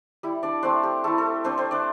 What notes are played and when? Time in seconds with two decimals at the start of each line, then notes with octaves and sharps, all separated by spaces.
0.23 G3 E4
0.43 D4 D5
0.63 A3 C4 D4 C5
0.83 G4
1.04 A3 E4 A4
1.18 A4
1.44 A3 C4 D4 C5
1.58 C4 C5
1.71 D4 D5